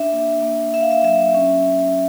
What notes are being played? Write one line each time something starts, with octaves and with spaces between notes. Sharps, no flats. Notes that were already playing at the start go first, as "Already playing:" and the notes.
Already playing: D4 E5
A#3
A#3
D4 E5
F5
E5
F#3 E5
C#4